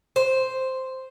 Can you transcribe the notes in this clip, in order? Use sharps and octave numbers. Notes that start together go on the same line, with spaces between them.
C5